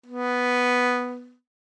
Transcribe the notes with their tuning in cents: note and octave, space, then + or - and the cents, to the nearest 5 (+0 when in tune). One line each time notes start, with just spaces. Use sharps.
B3 +0